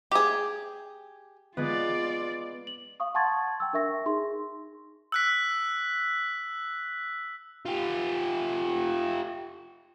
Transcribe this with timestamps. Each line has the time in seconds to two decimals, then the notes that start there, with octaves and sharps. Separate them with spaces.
0.11 G4 G#4
1.57 G#3 B3 F4 D5
2.67 F#7
3.00 F5 C#6 D#6
3.15 F#5 A5 C6 C#6 G#6 A6
3.60 G5 E6
3.73 D4 A#4 E5 C#6 A#6
4.06 D#4 G#4 C6
5.12 E6 F#6 B6
7.66 F4 G4